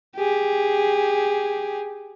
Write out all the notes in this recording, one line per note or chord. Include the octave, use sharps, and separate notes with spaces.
G4 G#4